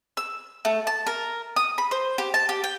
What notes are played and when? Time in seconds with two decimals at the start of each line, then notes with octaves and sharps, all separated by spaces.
0.17 E6
0.65 A3
0.87 A5
1.07 A#4
1.56 D#6
1.78 B5
1.91 C5
2.18 G4
2.34 A5
2.49 G4
2.64 G5